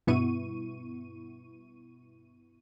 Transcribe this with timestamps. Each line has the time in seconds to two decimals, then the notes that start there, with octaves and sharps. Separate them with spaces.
0.07 G2 B2 B3 E4 C#6 D#7